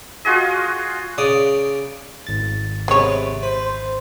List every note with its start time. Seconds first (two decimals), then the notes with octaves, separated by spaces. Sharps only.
0.25 F4 F#4 G#4 D#5
1.18 C#3 D5 D#6
2.27 G#1 A6
2.88 C3 G#3 B3 C#5
3.43 B4 C5